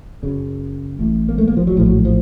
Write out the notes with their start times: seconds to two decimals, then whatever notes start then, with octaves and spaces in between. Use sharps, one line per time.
0.22 F#1 F#2 C#3
0.99 A1 A2
1.29 A#3
1.38 A3
1.48 A#3
1.57 F3
1.67 F#3
1.76 A#1 A2 F3
1.86 F#3
2.05 F3